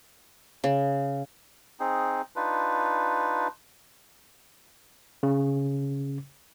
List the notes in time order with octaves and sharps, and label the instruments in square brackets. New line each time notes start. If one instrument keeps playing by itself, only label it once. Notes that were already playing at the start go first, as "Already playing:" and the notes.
[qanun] C#3
[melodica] C4 D#4 G#4
D4 D#4 F4 B4
[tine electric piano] C#3